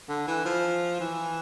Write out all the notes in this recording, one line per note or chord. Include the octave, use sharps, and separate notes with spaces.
D3
E3
F3
E3